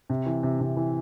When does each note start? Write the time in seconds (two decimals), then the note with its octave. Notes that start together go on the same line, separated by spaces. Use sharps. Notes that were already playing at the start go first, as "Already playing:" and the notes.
0.10 C3
0.26 E3
0.43 C3
0.60 C3
0.77 E3